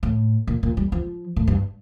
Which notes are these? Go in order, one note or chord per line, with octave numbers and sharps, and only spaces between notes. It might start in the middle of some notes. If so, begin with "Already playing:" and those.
A2
A#2
A#2
G3
F3
A2
G2